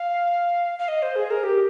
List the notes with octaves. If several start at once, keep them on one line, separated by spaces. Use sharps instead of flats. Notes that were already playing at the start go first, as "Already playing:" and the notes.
Already playing: F5
F5
D#5
C5
G#4
A#4
G4